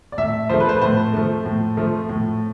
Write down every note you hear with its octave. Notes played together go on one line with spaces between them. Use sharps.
D5
A2 E5
F3 A3 C5
B4
C5
B4
A2 C5
F3 A3
A2
F3 A3
A2